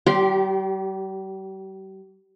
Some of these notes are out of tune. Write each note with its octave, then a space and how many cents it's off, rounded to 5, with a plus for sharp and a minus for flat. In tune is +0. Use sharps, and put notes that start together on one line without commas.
G3 -40 G4 -10 C6 +0